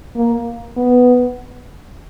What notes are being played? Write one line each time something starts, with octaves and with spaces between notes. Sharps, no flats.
A#3
B3